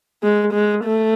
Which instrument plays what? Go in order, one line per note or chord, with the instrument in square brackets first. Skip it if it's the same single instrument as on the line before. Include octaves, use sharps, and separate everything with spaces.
[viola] G#3
G#3
A3